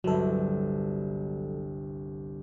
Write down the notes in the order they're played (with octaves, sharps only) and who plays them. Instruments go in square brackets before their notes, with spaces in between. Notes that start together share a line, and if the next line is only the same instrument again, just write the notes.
[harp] G1 C2 [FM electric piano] F#3 A4